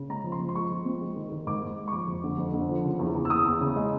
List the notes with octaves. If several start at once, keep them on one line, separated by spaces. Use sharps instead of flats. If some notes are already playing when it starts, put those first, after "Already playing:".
Already playing: C#3
G#3 A#5
F3
C6
F3
C6
G#3 C#6
F3
C4
G#3
D#3
D#3
G#2 D6
G#3
G#3
C#6
F3 D6
F2
D3
F2
D3
F3
C#3
E2
E2
E6
E2 D#6
E2
C#3
G#3